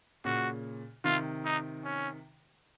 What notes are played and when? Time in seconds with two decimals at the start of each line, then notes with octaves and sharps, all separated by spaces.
0.25 A#2 C#3 F#4
1.04 C3 D#3 F4
1.45 D#4
1.84 C#4